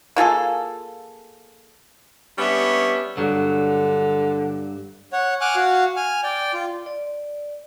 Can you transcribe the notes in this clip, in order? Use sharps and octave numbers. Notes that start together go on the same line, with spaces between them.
A#3 F4 G#4 A4
G3 B3 C#4 D4 E5
G2 D3 F#3
C#5 F#5
F#5 G#5 D6 F6 F#6
F#4 F5 F#5
G#5 F6
D5 G5
F4
D5